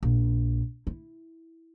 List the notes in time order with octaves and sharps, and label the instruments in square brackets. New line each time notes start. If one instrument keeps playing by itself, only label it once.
[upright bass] A#1
E4